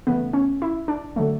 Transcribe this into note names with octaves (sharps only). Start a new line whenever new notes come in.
C#3 E3 A3 B3
C#4
E4
D4
D3 F#3 A3